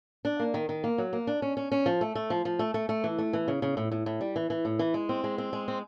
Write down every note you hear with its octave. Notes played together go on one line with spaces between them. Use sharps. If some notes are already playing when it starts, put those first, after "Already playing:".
D4
A#3
D#3
D#3
A#3
F#3
A#3
D4
C#4
C#4
C#4
F3
A3
A3
F3
F3
A3
A3
A3
E3
A3
E3
C#3
C#3
A2
A2
A2
G3
E3
E3
A2
E3
G#3
C4
G#3
C4
G#3
C4